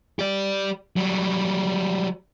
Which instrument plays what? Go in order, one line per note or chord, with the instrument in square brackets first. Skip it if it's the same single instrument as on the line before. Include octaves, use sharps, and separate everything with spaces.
[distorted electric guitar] G4 D5
F#3 G3